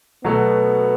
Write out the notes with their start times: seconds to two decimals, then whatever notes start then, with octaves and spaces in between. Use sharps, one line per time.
0.24 B2 F#3 A3 B3